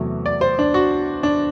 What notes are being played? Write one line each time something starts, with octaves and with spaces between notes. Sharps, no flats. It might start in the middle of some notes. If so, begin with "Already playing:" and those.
Already playing: E2 C3 F#3 A3
D5
C5
D4
F#4
D4